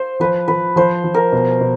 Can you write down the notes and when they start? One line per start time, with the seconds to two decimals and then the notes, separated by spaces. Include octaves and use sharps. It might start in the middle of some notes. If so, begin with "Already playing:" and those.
Already playing: C5
0.20 F3 B4
0.48 F3 B4
0.76 F3 C5
1.04 F3
1.14 A#4
1.32 B2
1.61 B2